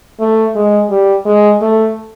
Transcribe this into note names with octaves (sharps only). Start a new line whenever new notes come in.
A3
G#3
G3
G#3
A3